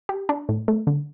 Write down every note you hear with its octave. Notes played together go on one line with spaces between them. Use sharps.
G4
D4
A2
A3
D3